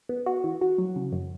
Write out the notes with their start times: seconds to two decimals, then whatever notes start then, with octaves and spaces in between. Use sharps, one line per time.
0.09 B3
0.26 F#4
0.44 E3
0.61 F#4
0.78 F#3
0.96 C#3
1.12 F#2